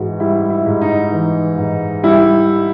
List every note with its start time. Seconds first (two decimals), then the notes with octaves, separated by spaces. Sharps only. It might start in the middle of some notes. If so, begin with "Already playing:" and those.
Already playing: G#2 E3 F#4
0.20 G3 E4
0.50 E4
0.66 G#2
0.81 D#4
1.12 E3
1.57 G#2
2.03 G3 E4